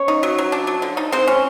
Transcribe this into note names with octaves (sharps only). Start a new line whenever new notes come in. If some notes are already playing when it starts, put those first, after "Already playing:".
Already playing: C#4 C#5
D#4
F#3
F#3
D4
F#3
D3
D#4
G#3 C4 C5
C#4